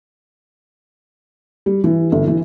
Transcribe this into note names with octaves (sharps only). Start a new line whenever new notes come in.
G3
E3
G1
E3